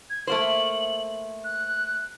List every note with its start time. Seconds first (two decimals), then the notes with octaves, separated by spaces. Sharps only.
0.10 G#6
0.27 A3 A#3 C5 F#7
1.44 F#6